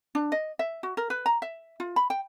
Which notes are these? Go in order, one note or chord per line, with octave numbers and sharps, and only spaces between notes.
D4
D#5
E5
F#4
A#4
B4
A#5
E5
F4
B5
G5